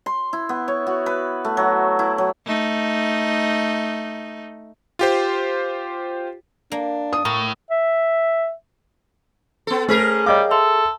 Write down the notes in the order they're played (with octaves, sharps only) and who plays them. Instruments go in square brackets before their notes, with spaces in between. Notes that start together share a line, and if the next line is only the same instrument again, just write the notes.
[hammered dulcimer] C6
E4
B3
C#5
F#4
B4
A3
F#3
E4
F#3
[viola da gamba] A3 D#4
[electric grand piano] F4 G4 C5
[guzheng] A#3 [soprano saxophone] D4
[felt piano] D#6
[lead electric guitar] A2 [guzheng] A#4 [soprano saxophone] C#6
[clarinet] E5
[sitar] B3 A4
[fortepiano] A3 [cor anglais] C#4 [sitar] G#4 A#4 [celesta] C5 B6 C7
[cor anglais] G3 [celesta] C#5 D#5 F5 [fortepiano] G5 D6
[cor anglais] A4 [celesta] E5 C6